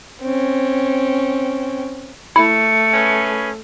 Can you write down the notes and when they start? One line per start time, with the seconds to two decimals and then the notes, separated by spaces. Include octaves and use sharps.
0.22 C4 C#4
2.36 A3 E4 C#7
2.93 C#4 G#4 B4